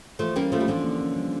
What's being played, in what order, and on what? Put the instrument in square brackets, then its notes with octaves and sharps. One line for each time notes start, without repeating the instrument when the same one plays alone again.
[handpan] E3 [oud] F3 A3
[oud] G3 A#3 [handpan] C#4
[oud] F3 A3 [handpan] A#3
[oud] G3
[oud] D3 F3 [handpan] E3
[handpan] A#3
C#4
G3